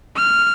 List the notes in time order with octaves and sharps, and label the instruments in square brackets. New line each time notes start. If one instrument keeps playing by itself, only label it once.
[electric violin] F6